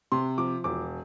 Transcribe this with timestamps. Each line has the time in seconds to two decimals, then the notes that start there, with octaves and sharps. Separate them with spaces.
0.12 C3 C6
0.38 F3 D6
0.64 E1 D6